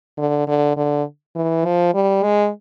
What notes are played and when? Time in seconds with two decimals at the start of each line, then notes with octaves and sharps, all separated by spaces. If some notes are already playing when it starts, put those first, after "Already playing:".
0.18 D3
0.48 D3
0.77 D3
1.35 E3
1.65 F3
1.94 G3
2.23 G#3